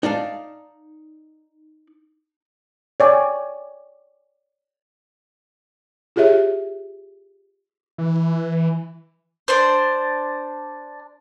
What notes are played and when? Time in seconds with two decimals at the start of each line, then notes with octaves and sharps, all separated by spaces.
0.03 D#4 D5 F5 A5
3.00 C#5 D5 G5 G#5
6.16 F4 G4 G#4 C#5 E5
7.98 E3
9.48 D4 C5